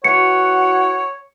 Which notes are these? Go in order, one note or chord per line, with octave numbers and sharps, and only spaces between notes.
E3 F#4 C#5 F#5 C#7